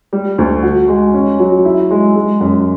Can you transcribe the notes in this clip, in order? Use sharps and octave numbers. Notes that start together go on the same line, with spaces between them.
G3
D2
F#4
G#3
C#4
F#3
E4
G#3
G#3
F#2